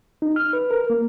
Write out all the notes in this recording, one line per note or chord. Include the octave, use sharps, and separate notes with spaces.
D#4
F6
B4
A#4
A#3